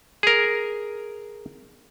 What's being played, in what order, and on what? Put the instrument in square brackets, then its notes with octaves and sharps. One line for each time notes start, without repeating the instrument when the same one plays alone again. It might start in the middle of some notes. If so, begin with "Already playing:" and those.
[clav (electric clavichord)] G#4 A#4